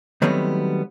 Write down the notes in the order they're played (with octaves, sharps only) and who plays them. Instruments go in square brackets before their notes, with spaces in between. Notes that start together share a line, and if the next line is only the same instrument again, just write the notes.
[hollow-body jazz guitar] D#3 F#3 G3 A3 B3 C4